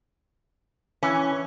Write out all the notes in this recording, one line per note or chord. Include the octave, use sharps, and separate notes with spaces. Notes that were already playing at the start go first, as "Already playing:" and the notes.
E3 C#4